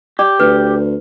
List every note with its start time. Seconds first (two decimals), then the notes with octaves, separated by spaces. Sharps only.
0.19 G4 D5
0.40 D2 B4